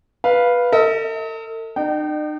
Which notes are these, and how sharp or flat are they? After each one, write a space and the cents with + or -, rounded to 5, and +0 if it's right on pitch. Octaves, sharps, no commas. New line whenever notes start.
B4 -10 F5 +0
A4 +45 D#5 +45
D#4 -45 D5 +45 G5 -30